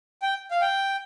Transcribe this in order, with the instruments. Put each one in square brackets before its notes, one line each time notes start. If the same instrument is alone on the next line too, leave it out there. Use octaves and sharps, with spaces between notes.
[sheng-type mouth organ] G5
F5
G5